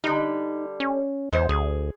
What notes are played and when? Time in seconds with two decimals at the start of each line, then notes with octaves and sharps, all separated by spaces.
0.04 D3 G3 D#4
0.80 C#4
1.33 E2 G#3 C5 C#5
1.49 D2 G#4